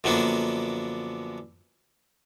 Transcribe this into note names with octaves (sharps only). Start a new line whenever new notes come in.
F#2 D3 F3 A#3 B3 D4